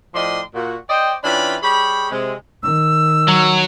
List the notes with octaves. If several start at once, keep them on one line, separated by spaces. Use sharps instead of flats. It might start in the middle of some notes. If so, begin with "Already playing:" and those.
A2 F3 D5 D#5 G5 C6
A#2 F#4
C5 D5 D#5 G5
E3 C#4 D4 F4 G5 B5
G3 G#4 C#5 B5
C3 G#3
D#3 E6
F#3